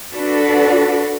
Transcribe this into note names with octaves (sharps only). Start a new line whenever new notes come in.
D4 F#4 A4 B4 D5